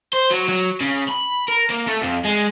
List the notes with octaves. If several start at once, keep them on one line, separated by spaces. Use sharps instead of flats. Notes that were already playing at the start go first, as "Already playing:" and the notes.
C5
F#3
F#3
C#3
B5
A#4
A#3
A3
F2
G#3